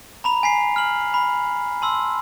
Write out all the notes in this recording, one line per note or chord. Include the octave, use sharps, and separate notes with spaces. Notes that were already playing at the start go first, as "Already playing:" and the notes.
A#5 B5 F7
G#5 B6 C7
F6 F#7
B5
A5 C6 E6